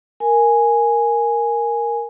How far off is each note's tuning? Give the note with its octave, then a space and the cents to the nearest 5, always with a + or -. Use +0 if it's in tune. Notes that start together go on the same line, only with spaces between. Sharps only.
A#4 +0 G#5 +0